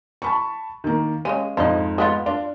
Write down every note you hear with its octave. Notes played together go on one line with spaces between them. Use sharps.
A5 B5 C#6
D#3 A#3
C#3 G#3 C#4 D#7
F2 G#2 F3 D#5
G#3 B3 F4
D4 F4